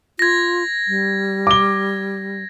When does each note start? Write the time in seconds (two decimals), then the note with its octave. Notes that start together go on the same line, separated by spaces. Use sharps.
0.19 F4 G#6 A#6
0.87 G3
1.47 D6 G7